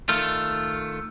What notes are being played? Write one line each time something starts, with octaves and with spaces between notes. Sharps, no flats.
D#3 A3 F4